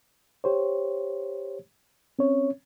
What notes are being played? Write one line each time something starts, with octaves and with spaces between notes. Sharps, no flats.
G4 C5 C#5
C4 C#4 C#5